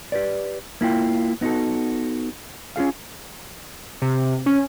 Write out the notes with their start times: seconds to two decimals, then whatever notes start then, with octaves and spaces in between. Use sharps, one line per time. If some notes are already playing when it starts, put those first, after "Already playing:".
0.12 G4 B4 D5
0.81 A#3 E4 F4 G5
1.41 B3 D#4 E4 F#4 A4
2.76 C#4 F4 G#4 F5
4.02 C3
4.46 C#4